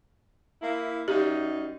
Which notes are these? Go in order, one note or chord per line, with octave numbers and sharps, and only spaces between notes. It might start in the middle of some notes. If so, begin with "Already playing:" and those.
A#3 E4
F#2 G3 D#4 G4